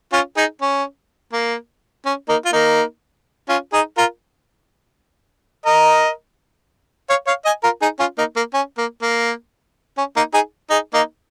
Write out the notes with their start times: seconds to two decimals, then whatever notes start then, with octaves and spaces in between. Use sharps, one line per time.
0.13 C#4 F4
0.37 D#4 G#4
0.62 C#4
1.33 A#3
2.05 C#4
2.29 A#3 D#4
2.45 F4
2.53 A#3 D#4
3.49 C#4 F4
3.73 D#4 G#4
3.97 F4 A#4
5.66 A#4 D#5
7.10 C#5 F5
7.27 C#5 F5
7.45 D#5 G#5
7.64 F4 A#4
7.82 D#4 G#4
7.99 C#4 F4
8.18 A#3 D#4
8.36 A#3
8.54 C#4
8.78 A#3
9.02 A#3
9.98 C#4
10.16 A#3 D#4
10.33 D#4 G#4
10.70 D#4 G#4
10.94 A#3 D#4